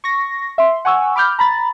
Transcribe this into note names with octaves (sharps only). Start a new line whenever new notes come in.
C#6 A#6
E5 C6
F#5 G#5 C#6 E6
B5 D6 F6 G6
A#5 B5 A6